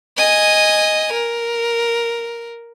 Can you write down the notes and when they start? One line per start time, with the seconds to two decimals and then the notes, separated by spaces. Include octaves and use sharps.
0.17 D#5 G#5
1.13 A#4